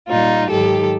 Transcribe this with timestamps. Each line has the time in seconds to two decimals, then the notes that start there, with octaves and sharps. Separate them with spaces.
0.09 A#2 G3 D#4 F4
0.49 G#2 D#3 F#3 G4 A4